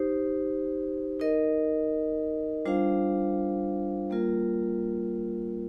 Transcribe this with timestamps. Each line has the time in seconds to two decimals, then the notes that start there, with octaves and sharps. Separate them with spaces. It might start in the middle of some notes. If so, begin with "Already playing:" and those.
Already playing: D#4 G4 C5
1.20 D#4 A#4 D#5
2.65 G3 D4 F4 C5 F5
4.10 G3 A#3 F4 A#4